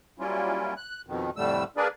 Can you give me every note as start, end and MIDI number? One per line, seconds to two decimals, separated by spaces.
0.19 0.74 54
0.19 0.74 55
0.19 0.74 58
0.19 0.74 61
0.19 0.74 64
0.19 0.74 65
0.76 1.01 90
1.07 1.30 41
1.07 1.30 47
1.07 1.30 51
1.37 1.64 41
1.37 1.64 45
1.37 1.64 50
1.37 1.64 55
1.37 1.64 57
1.37 1.64 88
1.77 1.88 58
1.77 1.88 62
1.77 1.88 68
1.77 1.88 70
1.77 1.88 71
1.77 1.88 74